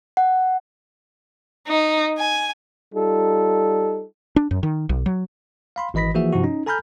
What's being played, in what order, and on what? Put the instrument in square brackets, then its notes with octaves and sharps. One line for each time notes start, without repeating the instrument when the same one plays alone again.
[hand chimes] F#5
[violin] D#4
G#5
[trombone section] G3 D#4 F4 A4
[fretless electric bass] D4
F#2
D#3
B1
F#3
[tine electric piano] F5 B5 C6
G#1 E3 D#5 B5 A#6 B6
E3 F3 A#3 F#4 G#4 E5
G2 C3 F3 E4 F#4
C#4 D#4
A4 G#5 A#5 B5 F6 G6